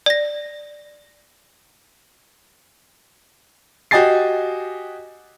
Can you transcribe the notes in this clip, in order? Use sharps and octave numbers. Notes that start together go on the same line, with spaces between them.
D5 A#6
F#4 G4 D#5 G#5 A6 C7